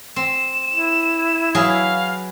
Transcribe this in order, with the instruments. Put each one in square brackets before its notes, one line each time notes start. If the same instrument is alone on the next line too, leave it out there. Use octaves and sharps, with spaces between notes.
[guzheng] C4 [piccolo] E7
[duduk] E4
[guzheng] F#3 G#4 B4 [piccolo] F5